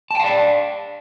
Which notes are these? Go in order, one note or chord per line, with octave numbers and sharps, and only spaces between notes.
D5 F5 G5 A5